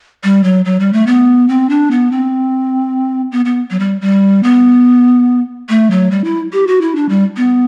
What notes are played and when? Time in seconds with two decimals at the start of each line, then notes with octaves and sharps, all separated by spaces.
0.24 G3
0.44 F#3
0.65 F#3
0.80 G3
0.93 A3
1.07 B3
1.49 C4
1.70 D4
1.91 B3
2.12 C4
3.32 B3
3.45 B3
3.71 F#3
3.79 G3
4.01 G3
4.43 B3
5.69 A3
5.91 F#3
6.11 G3
6.24 E4
6.53 G4
6.67 F#4
6.81 E4
6.96 D4
7.09 G3
7.37 B3